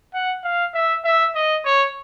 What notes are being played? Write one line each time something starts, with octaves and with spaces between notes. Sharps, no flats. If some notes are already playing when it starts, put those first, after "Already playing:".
F#5
F5
E5
E5
D#5
C#5